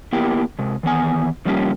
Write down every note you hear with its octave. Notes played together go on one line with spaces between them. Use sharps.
A#3 B3 E4 G4 A#4 G5
C3 G#3
D#3 E3 B3 G#5
C#3 F3 G3 A#3 C#4 G4